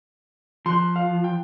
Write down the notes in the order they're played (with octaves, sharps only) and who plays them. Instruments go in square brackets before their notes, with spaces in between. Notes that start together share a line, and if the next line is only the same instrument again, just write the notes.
[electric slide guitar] F3 [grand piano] C6 F#6
[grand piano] F5
G5